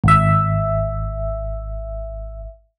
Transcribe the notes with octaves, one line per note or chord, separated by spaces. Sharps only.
G#1 E5